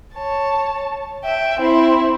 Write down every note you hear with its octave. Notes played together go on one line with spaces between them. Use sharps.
C#5 A5
E5 G5
C4 E4